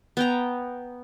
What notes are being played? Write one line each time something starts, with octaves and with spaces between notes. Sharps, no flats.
B3 G5 A#5